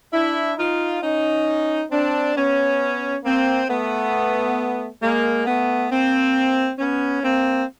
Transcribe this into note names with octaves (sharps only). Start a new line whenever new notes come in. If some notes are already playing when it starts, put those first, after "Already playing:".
D4 E4
D#4 F4
C#4 D#4
C4 D4
B3 C#4
A#3 C4
A3 B3
G#3 A#3
A3 B3
A#3 C4
B3 C#4
A#3 C4